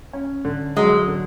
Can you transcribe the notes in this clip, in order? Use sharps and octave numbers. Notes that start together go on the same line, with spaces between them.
C#4
D3
F#3 G#3
D3